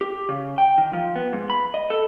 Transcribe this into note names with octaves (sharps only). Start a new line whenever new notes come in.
G4
C#3
G5
D#3
F3
B3
G#2
B5
D#5
A4